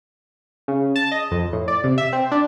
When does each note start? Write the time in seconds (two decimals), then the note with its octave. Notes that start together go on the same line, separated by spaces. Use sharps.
0.68 C#3
0.96 A5
1.12 D#5
1.31 F2
1.53 A2
1.68 D5
1.84 C3
1.98 E5
2.13 C4
2.32 D4